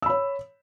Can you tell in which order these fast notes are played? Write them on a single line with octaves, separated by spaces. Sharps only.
E6 B5 C#5